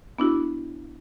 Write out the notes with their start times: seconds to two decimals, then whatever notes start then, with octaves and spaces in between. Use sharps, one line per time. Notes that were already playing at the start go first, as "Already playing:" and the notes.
0.19 B3 D4 E4 F#4